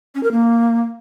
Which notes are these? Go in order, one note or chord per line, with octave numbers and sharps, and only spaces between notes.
C#4
A#4
A#3